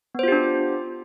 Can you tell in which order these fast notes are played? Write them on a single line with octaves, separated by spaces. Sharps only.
B3 C5 F4 G4 D4